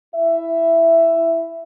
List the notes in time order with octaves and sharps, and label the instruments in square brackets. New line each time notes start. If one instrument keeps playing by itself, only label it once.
[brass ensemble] E4 E5